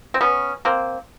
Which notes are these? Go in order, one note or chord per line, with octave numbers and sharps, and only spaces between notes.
C4
B3 C#4
A#3 C4